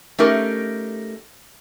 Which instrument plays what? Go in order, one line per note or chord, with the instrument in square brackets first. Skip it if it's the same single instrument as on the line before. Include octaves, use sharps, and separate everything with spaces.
[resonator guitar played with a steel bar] A3 C#4 D#4 G4 A#4